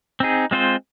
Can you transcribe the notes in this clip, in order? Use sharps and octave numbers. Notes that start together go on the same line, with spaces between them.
C4 D#4 G#4
G#3 C4 F4 C5